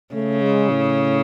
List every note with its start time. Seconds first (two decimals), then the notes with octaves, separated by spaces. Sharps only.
0.13 C#3 A3
0.42 G#3
0.70 A2